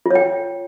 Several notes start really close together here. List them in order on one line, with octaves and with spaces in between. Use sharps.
F4 C#5 G5